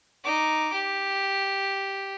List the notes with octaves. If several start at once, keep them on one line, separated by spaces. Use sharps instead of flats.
D#4 D6
G4